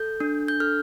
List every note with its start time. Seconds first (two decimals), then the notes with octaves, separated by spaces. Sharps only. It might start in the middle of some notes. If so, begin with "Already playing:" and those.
Already playing: A4 G6
0.20 D4
0.48 G6
0.60 A4 F6